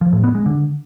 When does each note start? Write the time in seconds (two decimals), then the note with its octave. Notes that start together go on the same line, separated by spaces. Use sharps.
0.01 F3
0.12 A2
0.24 B3
0.35 G#3
0.46 D3